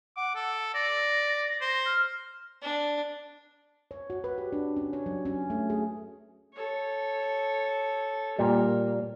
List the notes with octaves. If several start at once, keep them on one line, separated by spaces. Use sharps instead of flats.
F#5 D6
A4
D5 A#6
C5
F6
D4
C#5
F#4
B4
G4
D4
C#4
C#5
F#3
C#4
A3
G#4
A4 C#5
A#2 G3 A#3